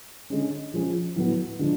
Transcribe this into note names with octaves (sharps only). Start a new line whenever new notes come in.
D3 G#3 C#4
F3 G#3 C#4 G#4
A2 F#3 B3
D3 F3 G#3 D4